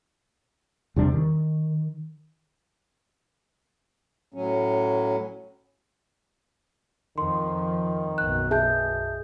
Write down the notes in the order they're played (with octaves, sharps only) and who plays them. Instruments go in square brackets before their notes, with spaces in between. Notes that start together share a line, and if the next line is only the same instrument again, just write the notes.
[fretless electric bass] E2 C3 G3 D4
D#3
[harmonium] A2 F#3 C#4
[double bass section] F2 F3 [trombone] D#3 [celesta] C6
[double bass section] B1 F#2 B2 [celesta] F#6
[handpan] G#4 [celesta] E5 A5 G6